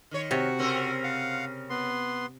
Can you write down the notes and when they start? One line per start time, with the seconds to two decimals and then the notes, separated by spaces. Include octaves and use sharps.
0.11 D#3 C#5
0.31 C3 F#4 F#5
0.59 C#3 C4 A#4
1.04 F5 F#5
1.70 B3 C6